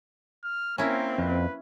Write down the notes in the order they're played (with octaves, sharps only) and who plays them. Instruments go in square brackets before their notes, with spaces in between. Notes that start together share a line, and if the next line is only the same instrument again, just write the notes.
[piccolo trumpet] F6
[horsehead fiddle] A#3 C4 [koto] C#4 E4 [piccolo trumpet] A#4
[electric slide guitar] F2 [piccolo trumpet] B4